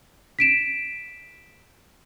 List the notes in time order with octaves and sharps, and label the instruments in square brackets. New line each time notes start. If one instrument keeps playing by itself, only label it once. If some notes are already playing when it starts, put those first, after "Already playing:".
[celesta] B6 D7 E7